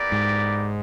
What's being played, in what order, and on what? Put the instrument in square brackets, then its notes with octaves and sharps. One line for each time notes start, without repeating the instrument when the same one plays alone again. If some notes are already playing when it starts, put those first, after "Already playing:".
Already playing: [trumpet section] B3 E4 G4 A#4 D5
[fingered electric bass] G#2